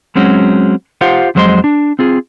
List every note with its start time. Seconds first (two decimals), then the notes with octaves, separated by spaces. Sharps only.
0.15 F#3 G#3 C4 C#4 F#4
1.01 F4 G4 C5 F5 F#5
1.35 F2 F#3 G#3 C5 D#5 C6
1.64 D4
1.99 C4 F4 G#4